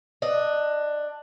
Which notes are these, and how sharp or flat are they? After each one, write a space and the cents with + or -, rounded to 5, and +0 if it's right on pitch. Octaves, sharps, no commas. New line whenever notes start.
D4 +15 D#5 +0